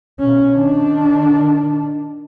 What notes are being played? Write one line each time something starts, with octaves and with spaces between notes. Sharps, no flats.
B2 C#4
D#3 D4